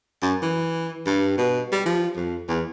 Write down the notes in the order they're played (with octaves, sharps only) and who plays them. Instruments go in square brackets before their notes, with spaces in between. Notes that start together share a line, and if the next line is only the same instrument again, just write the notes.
[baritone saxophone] F#2
E3
G2
B2
G3
F3
F2
E2